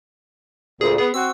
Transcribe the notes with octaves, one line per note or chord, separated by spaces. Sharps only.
D2 A#2 G#4
B3 G#4
C4 F#4 E6